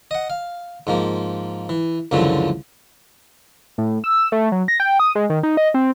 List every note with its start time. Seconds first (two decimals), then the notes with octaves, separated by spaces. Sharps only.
0.11 D#5 F#5
0.30 F5
0.87 G#2 F3 A#3
1.69 E3
2.11 C#2 F#2 D3 E3 F3 A3
3.78 A2
4.04 E6
4.32 A3
4.52 F#3
4.68 A#6
4.80 G5
5.00 D#6
5.15 G#3
5.30 D#3
5.43 D#4
5.57 D#5
5.74 C4